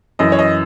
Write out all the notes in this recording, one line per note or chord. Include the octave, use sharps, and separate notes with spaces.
F#2 E3 D#5
C#5
D#5